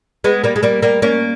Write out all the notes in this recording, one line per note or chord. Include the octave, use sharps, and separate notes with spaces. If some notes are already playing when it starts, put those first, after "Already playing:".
G#3 B3
G3 A#3
G#3
G3 A#3
G3 A#3
A#3 C#4